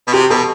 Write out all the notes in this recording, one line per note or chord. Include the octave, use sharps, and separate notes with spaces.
B2
C3 G4
B2 A4